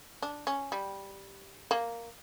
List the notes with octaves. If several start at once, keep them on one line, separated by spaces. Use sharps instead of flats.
D4
C#4
G3
A#3